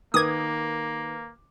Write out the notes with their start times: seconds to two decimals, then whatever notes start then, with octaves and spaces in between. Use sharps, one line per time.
0.14 D#3 A#3 B4 D6 D#6 G#6